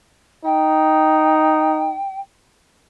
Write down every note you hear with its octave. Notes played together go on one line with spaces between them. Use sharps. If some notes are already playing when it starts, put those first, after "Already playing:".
D#4 G5